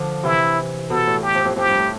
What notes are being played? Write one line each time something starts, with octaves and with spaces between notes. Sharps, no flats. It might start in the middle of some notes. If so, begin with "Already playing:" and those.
Already playing: D3 F3
C3 E3 E4
B2 A4
A2
G4
F2
F2
F2 G4
G2
A2